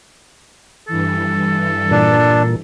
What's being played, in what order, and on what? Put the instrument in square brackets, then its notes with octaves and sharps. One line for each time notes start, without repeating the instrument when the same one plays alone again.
[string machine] G2 E3 [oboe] A4
[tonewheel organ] A#2 [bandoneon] D4